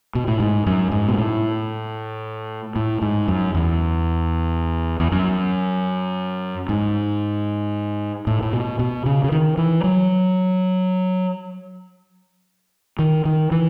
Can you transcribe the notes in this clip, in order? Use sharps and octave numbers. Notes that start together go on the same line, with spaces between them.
B2
A2
G#2
F#2
G#2
B2
A2
A2
G#2
F#2
E2
E2
F#2
G#2
A2
A2
B2
B2
C#3
C#3
D#3
E3
F#3
D#3
D#3
E3